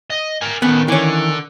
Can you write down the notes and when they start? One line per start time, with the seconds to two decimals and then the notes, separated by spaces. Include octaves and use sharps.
0.10 D#5
0.41 A#4 G#5
0.62 D#3 B3 C#4 A4
0.88 D3 E3 C#4